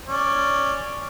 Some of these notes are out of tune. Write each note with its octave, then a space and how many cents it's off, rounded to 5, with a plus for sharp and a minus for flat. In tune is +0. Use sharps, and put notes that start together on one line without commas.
C#4 +0 D5 +0